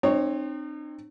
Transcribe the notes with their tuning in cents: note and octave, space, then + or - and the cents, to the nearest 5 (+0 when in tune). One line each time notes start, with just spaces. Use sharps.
C4 +20 D#4 -40 C#5 +0